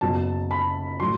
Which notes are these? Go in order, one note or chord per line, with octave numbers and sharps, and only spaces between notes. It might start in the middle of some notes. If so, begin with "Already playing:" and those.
F#1 F#2 F#3 B3 A5
B5
A2 F#3 C6